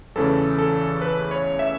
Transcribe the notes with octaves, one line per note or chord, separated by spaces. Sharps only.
E2 C#3 E3 A3 C#4 A4
A4
B4
C#5
E5